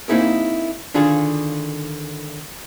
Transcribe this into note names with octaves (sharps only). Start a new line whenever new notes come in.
A#3 C4 D#4 E4 G#4 A#4
D3 D#3 D4 F4 G#4